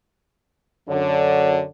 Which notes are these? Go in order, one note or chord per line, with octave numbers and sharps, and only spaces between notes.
F#2 D3 C#5